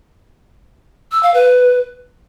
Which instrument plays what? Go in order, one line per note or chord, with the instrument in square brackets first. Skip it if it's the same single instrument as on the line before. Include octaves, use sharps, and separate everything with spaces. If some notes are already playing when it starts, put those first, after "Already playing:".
[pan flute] E6
F5
B4